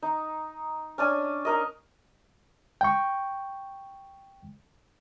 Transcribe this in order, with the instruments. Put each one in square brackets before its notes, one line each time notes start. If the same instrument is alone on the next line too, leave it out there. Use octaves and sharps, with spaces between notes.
[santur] D#4
C#4 D4 G#5
D#4 A#4 D#5
[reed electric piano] G5 C#6